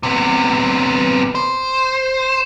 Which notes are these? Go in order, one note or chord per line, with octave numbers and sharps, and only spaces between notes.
C3 B3
C5